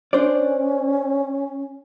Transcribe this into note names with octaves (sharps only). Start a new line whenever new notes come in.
C#4 D4 C5 D5